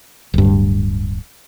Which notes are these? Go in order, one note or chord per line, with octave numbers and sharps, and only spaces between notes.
D1 G2